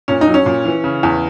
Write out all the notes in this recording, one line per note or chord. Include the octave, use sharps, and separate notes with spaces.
A#2 C#4
D#4
F#3
C#4
A#2
E3
C#3
E2